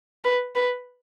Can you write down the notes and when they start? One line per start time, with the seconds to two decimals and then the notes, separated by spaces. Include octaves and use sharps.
0.25 B4
0.55 B4